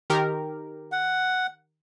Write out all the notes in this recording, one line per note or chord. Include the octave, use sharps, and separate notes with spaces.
D#3 G4 A#4
F#5